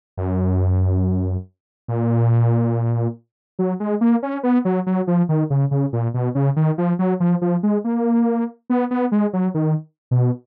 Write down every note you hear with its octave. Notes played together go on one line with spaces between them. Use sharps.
F#2
A#2
F#3
G#3
A#3
C#4
B3
F#3
F#3
F3
D#3
C#3
C#3
A#2
B2
C#3
D#3
F3
F#3
F3
F3
G#3
A#3
B3
B3
G#3
F#3
D#3
B2